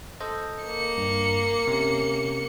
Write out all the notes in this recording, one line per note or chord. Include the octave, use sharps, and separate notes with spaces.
A4 C5 D#5
A#3 C#7
G2
C3 C#4